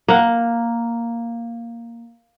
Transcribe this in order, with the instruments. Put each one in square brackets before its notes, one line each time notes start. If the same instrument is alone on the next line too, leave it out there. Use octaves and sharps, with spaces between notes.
[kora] A#3 F#5